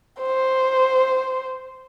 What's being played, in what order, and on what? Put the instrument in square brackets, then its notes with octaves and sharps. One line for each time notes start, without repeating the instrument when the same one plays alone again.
[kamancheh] C5